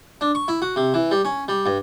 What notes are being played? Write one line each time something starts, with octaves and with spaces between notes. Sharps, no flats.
D4
C#6
E4
F#4
C3
E3
G3
C#4
G3
G2